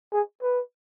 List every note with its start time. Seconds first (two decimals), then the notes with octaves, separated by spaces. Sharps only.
0.12 G#4
0.42 B4